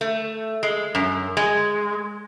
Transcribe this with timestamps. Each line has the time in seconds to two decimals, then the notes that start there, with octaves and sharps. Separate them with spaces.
0.01 A3
0.63 G#3
0.95 F#2
1.37 G#3